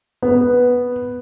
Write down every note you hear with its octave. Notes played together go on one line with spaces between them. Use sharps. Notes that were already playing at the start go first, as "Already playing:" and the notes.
B3